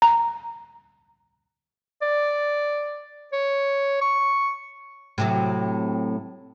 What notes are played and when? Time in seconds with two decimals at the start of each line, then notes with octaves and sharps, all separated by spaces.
0.02 A#5
2.02 D5
3.32 C#5
4.01 C#6
5.18 A2 C3 F#3